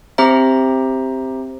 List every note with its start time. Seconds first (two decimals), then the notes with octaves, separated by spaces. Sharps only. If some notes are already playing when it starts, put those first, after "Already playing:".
0.18 C4 G4 C5 E5 A#5